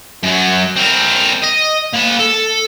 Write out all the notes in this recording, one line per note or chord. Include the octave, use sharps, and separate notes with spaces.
F#2 F#3
C4 A#4
D#5
A#3 B5
A4